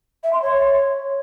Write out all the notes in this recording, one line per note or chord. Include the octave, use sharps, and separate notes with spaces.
E5
C6
C#5